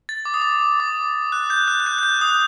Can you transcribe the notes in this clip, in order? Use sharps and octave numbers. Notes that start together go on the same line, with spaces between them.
A6
D6
D#6
D6
D6
F#6
G6
F#6
F#6
G6
G6
F#6
D#6